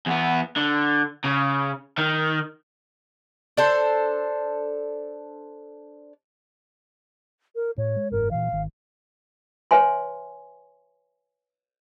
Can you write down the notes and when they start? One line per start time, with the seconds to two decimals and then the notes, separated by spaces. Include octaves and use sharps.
0.06 E2 B3
0.57 D3
1.24 C#3
1.98 D#3
3.57 D4 A4 C5
7.55 A#4
7.78 A2 C#5
7.97 G#3
8.11 F#1 G#2 A#4
8.31 A#2 E3 F5
8.52 G#1 D#3
9.71 B4 C#5 E5 G#5 C6